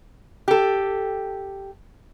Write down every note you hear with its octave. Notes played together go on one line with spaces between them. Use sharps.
G4 A4